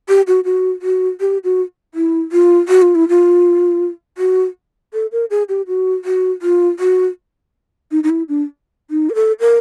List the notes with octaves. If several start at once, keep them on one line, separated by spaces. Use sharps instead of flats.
G4
F#4
F#4
F#4
G4
F#4
E4
F4
F#4
F4
E4
F4
F#4
A4
A#4
G#4
G4
F#4
F#4
F4
F#4
D#4
D#4
E4
D4
D#4
A#4
A4
A#4